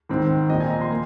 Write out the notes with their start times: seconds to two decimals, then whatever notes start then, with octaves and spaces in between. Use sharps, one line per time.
0.09 G#2 D#3 C4
0.49 A#2 F3 C4 D#5
0.60 G#5
0.70 A#5
0.81 C6
0.90 A#3